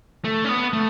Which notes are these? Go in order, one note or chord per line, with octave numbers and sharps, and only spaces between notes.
A3
C#4
B3
A3